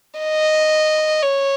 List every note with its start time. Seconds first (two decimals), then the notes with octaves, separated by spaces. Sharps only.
0.20 D#5
1.22 C#5